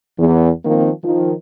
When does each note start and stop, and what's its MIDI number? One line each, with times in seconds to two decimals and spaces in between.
0.19 0.50 40
0.65 0.89 51
0.65 0.89 53
0.65 0.89 58
0.65 0.89 60
1.04 1.33 51
1.04 1.33 53